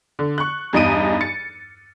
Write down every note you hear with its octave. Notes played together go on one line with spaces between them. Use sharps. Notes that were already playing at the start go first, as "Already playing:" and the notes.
D3
C#6 F#6
E2 G2 D#4 D#5 D7 D#7
A6 C#7